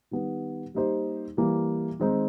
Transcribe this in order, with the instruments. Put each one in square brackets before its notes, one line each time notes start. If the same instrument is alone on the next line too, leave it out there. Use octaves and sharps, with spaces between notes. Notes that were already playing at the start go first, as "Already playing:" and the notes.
[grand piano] D#3 G3 B3
G3 A#3 D#4 G4 C5
E3 G3 A#3
D#3 G#3 C4 D#4